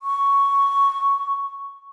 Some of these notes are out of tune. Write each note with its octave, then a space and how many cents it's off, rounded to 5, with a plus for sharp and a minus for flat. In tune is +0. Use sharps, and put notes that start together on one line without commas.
C#6 +5